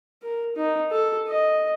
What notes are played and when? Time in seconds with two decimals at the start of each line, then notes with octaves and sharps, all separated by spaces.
0.22 A#4
0.56 D#4
0.91 A4
1.28 D#5